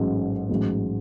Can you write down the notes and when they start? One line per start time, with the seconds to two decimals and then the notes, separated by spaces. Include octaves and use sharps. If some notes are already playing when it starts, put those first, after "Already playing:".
Already playing: A1 G#2 F#3
0.49 A1 G#2 F#3